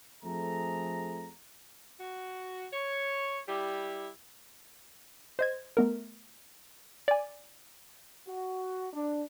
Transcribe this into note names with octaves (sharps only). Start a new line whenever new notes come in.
F2 F3 A3 G#4 A#5
F#4
C#5
G3 E4 G4
C5 D#5 G#6
A3 B3 A#4
D5 G#5
F#4
D4